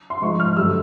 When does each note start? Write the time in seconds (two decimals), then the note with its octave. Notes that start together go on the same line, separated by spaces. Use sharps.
0.10 C6
0.22 G#2 F3 G#3 C#6
0.40 F6
0.57 G2 D3 F#3 A3 E6